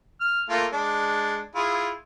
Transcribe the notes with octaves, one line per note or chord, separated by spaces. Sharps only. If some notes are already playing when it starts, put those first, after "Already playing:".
F6
A3 A#3 F4
G#3 D4
E4 F4 G#4